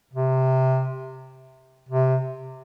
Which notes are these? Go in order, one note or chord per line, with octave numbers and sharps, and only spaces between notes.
C3
C3